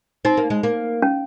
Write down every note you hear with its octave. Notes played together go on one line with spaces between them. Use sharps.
C4 D#4
A#3
G#3
A#3
C#4